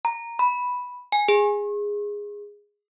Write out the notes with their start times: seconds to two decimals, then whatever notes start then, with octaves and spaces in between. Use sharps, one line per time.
0.05 A#5
0.39 B5
1.12 G#5
1.28 G#4